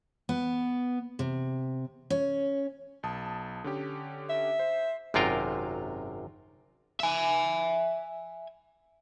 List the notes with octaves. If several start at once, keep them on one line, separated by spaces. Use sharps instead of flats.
B3
C3
C#4
B1 A5 D#6
D3 C#4 G4
E5
C5
G#1 F#2 C3 F4 A#4 G5
E5 G#5